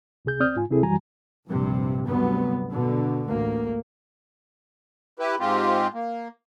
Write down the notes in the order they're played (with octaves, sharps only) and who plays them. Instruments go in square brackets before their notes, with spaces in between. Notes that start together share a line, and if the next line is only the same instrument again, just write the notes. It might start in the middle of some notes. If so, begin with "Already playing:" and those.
[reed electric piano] C#2 C3 G#4 G6
D2 C4 D5 D#6 F6 G6
G#2 F4 G#5
C#2 C3 C4 E4 G#4 A4
F#2 E3 G3 F#4 G#5 A#5
[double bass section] A#1 G2 C3
D2 G2 C3 F#3 B3
B2 D3
A1 D2 A#3
[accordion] E4 G4 B4
G#2 G#3 C4 F4 G4
A#3